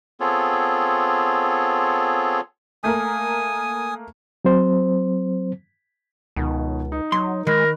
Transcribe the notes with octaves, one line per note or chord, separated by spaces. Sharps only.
B3 C4 F4 G#4 A4 C#5
A3 A#3 A#4 G#5 D#6
F#3 C4 C5
C#2 B2 D#3
D#4
F#3 C6
D#3 G#3 A#4 B5 F#6